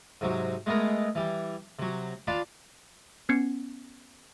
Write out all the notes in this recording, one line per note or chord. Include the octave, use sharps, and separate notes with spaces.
G#2 C3 F#3
G#3 A3 B3 G#4 A#4
E3 G3
C3 F#3
D4 F4 F5 A5 B5
B3 C#4 G#6 C7 C#7